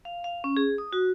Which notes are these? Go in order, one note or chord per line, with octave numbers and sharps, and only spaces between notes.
F5
F5
C#4
G#4
D#6
F#4